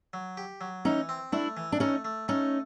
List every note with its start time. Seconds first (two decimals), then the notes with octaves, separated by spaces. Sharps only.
0.13 F#3
0.37 G4
0.61 F#3
0.85 E3 C#4 D#4
1.09 C4
1.32 A3 D4 E4
1.57 E3
1.72 D4
1.80 A3 C#4 D#4
2.05 A3
2.28 A3 C#4 D#4